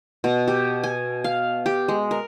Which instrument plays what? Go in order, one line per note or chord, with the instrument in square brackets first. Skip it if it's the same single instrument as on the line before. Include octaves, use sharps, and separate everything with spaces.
[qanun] B2
G4
G#5
F5
G4
G#3
A#4